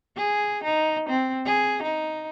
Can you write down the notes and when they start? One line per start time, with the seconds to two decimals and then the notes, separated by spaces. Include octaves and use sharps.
0.17 G#4
0.64 D#4
1.09 C4
1.46 G#4
1.83 D#4